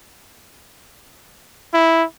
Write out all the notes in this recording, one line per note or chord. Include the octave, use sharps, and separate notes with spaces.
E4